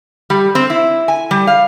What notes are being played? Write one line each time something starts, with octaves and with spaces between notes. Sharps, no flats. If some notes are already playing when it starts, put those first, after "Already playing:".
G3
C4
E4
G#5
G3
F5